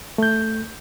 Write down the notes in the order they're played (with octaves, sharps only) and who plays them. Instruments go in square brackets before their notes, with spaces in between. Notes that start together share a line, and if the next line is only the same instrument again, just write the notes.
[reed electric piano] A3 G6